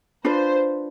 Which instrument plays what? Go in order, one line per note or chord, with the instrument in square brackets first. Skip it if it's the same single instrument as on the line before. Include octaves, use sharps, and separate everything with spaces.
[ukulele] D4 F4 B4 [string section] C5